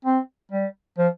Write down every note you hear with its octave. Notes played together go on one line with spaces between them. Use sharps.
C4
G3
F3